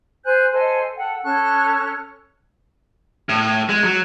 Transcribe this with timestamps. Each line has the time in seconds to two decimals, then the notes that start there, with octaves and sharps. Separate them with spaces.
0.25 C5 G#5 F#6 G6
0.52 A4 C5 D#5 G#5
0.97 A4 F#5 G5
1.24 C#4 A4 C#6 F#6
3.29 A2
3.69 G#3
3.84 F#3